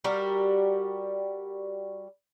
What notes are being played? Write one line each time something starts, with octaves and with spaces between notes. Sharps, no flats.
G3 F#4 G4 A#4